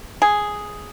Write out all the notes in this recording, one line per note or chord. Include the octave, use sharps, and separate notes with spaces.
G#4